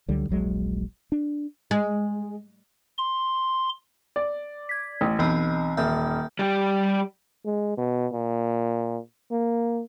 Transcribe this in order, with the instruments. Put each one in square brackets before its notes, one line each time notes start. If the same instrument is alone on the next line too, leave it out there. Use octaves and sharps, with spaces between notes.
[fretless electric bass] C#2 D3 F#3 G3
D#1 A#1 F#3 G#3
D4
[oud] G#3
[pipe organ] C6
[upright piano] D5
[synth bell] G#6 B6
[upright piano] A1
[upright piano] B1 [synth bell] E3 C4 D#5
[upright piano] D#1 [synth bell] E5 F6 G6
[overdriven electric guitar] G3 G4
[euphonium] G#3
B2
A#2
A#3